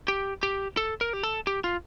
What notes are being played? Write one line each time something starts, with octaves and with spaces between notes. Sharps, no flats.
G4
G4
A4
A#4
G4
A4
G4
F4